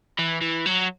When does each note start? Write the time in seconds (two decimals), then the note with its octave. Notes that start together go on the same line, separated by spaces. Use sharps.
0.19 E3
0.41 E3
0.66 F#3